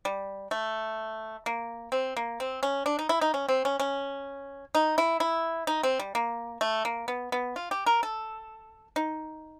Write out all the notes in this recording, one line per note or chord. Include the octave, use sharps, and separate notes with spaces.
G3
A3
A#3
C4
A#3
C4
C#4
D4
D#4
E4
D#4
C#4
C4
C#4
C#4
D#4
E4
E4
D#4
C4
G3
A#3
A3
A#3
B3
B3
F4
G4
A#4
A4
D#4